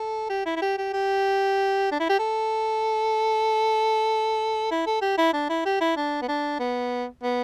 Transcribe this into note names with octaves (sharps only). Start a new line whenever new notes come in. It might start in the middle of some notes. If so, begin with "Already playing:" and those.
Already playing: A4
G4
E4
E4
G4
G4
G4
D4
E4
G4
A4
E4
A4
G4
E4
D4
E4
G4
E4
D4
B3
D4
B3
B3